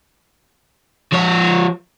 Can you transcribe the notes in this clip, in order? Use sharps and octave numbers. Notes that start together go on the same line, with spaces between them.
F3 C#5